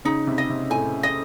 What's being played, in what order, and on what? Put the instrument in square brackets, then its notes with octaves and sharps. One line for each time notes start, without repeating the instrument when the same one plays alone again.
[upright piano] C#3 [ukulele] D#4
[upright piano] C3
[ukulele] D#5
[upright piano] C3
[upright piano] A2 [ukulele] G#5
[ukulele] D#5